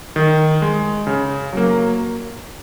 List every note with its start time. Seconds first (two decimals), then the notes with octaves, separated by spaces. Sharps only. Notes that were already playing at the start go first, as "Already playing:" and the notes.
0.16 D#3
0.62 G#3
1.07 C#3
1.53 F#3 A#3